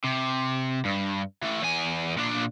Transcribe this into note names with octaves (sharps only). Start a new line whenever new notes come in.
C3
G2
E3 A3
E2 G#5
A#2 D4